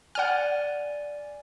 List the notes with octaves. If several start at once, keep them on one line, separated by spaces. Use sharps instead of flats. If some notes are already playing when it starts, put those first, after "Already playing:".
D5 F#5 G#5 F6